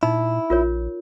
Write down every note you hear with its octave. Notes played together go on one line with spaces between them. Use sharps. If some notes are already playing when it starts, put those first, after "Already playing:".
A#2 D#4 E4
A#1 F4 A#4 C#5